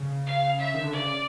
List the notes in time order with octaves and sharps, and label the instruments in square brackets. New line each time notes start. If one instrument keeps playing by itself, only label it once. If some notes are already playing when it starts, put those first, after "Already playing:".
Already playing: [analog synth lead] C#3
[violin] F5
E5
[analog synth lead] D#3
D3
[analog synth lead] C#3 [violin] D5